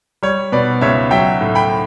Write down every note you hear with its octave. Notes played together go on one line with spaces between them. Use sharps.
G3 C#5
B2 B4 D5
C#2 C#5 E5
F#3 E5 G5
A2
G5 B5